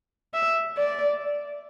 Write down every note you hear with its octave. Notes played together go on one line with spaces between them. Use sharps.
E5
D5